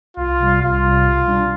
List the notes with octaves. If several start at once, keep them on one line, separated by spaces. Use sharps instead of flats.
C2 F4
C3 G3
C2 F4
C3 G3
B2
G3 D4